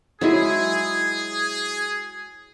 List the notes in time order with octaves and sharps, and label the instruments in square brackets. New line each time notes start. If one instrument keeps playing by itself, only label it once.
[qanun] F#3 G#3 E4 [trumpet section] G#4